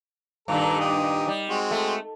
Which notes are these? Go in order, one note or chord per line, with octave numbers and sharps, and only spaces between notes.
G2 A#2 D#3 A4 A#5
G4 D#6
G3
G#3 C4 F#4
A3